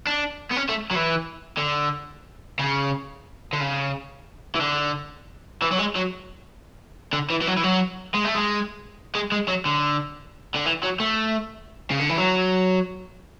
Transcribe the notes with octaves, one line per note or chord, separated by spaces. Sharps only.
D4
B3
C#4
A3
F#3
E3
D3
C#3
D3
C#3
E3
D3
E3
F#3
G#3
F#3
D3
E3
E3
F#3
E3
F#3
G#3
A3
G#3
G#3
G#3
F#3
D3
D3
E3
F#3
A3
C#3
D3
E3
F#3